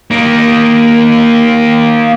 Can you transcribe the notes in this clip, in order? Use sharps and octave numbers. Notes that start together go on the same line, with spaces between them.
A#3 D#4